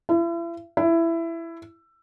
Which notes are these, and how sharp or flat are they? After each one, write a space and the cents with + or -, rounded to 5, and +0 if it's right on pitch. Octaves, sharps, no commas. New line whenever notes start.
E4 +40
E4 +15